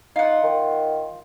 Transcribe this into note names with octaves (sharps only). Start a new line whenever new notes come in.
D#4 F4 F#5
D#3